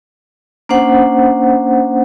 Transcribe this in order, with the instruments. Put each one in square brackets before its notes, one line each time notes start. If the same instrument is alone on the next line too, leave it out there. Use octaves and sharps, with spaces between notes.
[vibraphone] A#3 C#4 D4 C5 F#5